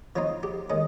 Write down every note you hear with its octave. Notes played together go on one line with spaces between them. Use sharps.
F3 C4 D#4 C#5
G4
D#3 G#3 C#4 G#4